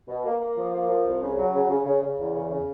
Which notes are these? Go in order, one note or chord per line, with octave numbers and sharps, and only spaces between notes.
B2
A#3
A#3
F3
A#3
F3
C2
C#3
F#3
C#3
C#3
C#3
C#3
E2
C#3
C#3